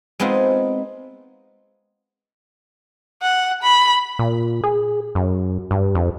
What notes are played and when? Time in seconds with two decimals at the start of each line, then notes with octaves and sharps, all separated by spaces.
0.20 G#3 B3 C4 D#4 F4
3.22 F#5
3.63 B5
4.19 A#2
4.64 G#4
5.15 F#2
5.71 G2
5.95 F2